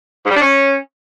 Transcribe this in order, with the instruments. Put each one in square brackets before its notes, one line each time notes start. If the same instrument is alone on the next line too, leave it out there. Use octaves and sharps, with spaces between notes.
[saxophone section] G#2
G3
D4
C#4